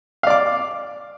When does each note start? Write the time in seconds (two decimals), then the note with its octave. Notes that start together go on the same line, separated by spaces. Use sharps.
0.23 F5
0.27 D5
0.30 D6